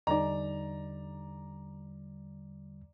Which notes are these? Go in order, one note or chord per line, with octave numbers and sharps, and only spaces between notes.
E2 D3 G3 D#4 D5 D#5 A#5